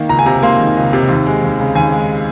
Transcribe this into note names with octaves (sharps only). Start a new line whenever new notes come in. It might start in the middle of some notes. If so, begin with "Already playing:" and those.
Already playing: D#3 A#3
C#2 A#5
G#5
C3 A#5
A#3 C6
D#3
C#2
C3
D#2
G#3
D#2
C#3
D#2 G#5
G#3